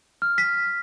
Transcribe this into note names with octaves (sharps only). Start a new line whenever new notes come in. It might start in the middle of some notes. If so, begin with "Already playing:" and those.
F6
B6